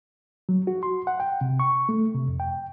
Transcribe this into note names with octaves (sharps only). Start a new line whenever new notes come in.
F#3
F#4
C6
F#5
G5
C3
C#6
A3
C3
F2
G5